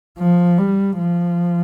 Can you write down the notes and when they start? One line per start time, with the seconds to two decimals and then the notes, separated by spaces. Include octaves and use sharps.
0.18 F3
0.58 G3
0.98 F3